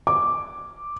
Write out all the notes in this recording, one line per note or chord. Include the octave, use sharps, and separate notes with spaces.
D6